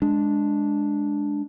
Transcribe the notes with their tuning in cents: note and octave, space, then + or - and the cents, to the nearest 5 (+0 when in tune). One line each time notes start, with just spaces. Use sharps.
G#3 +0 D4 -5